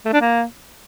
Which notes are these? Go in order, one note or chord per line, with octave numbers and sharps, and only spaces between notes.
A3
D4
A#3